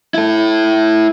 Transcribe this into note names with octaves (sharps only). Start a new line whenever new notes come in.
E4 A4